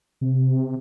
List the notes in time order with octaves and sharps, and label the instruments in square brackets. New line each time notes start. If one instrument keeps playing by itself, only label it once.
[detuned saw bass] C3